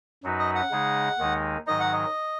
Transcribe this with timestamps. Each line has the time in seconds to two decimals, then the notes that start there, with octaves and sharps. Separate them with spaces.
0.24 F#2 F#3 D#4 F#4 B4
0.39 D#5
0.55 F#5
0.71 C#3 G#3 D#4 G#4
1.19 D#2 D#3 G#3 D#4
1.66 G#2 D#3 F#3 D#4 D#5
1.80 F#5
1.93 D#5